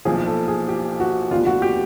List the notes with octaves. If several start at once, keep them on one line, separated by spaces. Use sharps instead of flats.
B1 A#2 F3 G#4
A4
G#4
G4
F#4
F1 D#2 D3 G3 B3 F4
F#4
G4